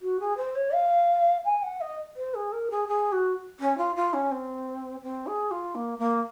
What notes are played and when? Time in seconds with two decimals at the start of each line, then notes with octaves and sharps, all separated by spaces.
0.01 F#4
0.20 G#4
0.37 C5
0.55 C#5
0.73 F5
1.45 G#5
1.63 F#5
1.81 D#5
2.16 C5
2.34 G#4
2.52 A#4
2.70 G#4
2.88 G#4
3.12 F#4
3.60 C#4
3.77 F4
3.95 F4
4.13 C#4
4.31 C4
5.03 C4
5.26 G#4
5.51 F4
5.75 A#3
5.98 A#3